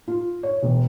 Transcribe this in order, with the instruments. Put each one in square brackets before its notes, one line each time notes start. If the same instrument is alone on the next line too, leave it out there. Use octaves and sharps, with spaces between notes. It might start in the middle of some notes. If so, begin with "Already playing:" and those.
[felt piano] F4
C#5
E1